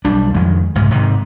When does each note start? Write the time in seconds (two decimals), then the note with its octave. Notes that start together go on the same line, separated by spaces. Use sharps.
0.05 B1 G3 D4
0.34 F2 D#3 G#3
0.75 C2 G#2 C#3 G#3
0.91 G#2 C3 D#3